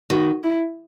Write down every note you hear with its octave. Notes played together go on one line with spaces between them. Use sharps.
D#3 F#4
E4